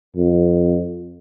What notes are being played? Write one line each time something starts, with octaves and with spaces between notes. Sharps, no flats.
F2